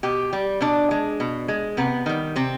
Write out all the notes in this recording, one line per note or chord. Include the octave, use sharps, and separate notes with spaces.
B2 G4
G3
B2 D4
G#3
B2
G#3
C3 B3
D#3 G3
C3 C4